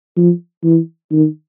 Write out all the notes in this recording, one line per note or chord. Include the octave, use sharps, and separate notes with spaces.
F3
E3
D#3